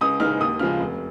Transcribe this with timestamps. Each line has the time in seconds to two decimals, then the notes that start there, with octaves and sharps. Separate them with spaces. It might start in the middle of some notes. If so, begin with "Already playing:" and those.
0.01 C#2 D#6
0.20 C#3 G#3 D#4 F6
0.40 D#2 D#6
0.59 C#3 F3 G#3 F6
0.80 F1